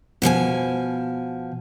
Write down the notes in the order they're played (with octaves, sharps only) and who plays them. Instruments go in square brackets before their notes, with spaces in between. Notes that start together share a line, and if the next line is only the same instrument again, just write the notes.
[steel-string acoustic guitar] B2 F3 C5 G#5